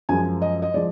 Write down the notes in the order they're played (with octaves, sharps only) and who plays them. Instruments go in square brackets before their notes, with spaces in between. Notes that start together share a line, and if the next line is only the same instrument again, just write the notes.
[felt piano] F#2 F3 G#3 G#5
D#5
D#5
F3 G#3 D5